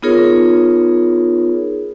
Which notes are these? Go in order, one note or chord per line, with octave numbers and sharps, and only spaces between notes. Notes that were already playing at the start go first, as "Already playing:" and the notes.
B3 D#4 F4 G#4 A#4 C#5